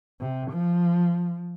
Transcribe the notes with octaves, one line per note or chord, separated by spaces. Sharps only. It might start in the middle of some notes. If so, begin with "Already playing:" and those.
C3
F3